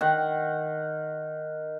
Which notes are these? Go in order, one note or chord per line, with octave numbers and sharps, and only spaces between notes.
D#3 F#5